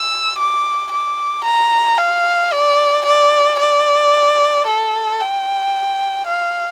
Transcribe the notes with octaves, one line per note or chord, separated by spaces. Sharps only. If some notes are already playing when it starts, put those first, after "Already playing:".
Already playing: E6
D6
D6
A#5
F5
D5
D5
D5
A4
G5
F5